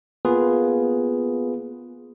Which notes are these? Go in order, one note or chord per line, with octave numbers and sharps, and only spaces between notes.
A#3 B3 F4 G#4 B4